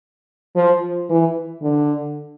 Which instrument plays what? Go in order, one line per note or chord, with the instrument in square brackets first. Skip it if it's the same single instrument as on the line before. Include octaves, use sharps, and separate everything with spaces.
[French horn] F3
E3
D3